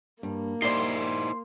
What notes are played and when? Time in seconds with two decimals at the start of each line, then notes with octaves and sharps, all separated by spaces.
0.23 G2 A#3
0.62 D#4 E4 G4 C5 D5 C6